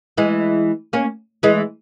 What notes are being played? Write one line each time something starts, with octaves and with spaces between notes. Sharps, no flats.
E3 G#3
A#3 C#4
E3 G#3